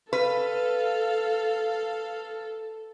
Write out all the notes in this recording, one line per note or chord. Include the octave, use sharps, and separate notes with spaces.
A4 B4 F5